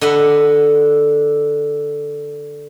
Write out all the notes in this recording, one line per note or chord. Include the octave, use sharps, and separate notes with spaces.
D3 D#5 F#5 B5